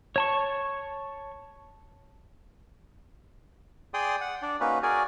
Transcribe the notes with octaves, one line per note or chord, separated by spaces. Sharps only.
C#5 A5 C#6
G#4 D5 G5 C6 D#6
F#5
D4 D5
A#3 C#4 D#4 F#4 B4
F#4 G#4 A#4 D5 G#5